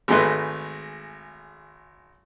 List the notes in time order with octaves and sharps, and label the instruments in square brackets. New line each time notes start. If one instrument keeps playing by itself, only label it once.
[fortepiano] G#1 G#3 A3 B4 C6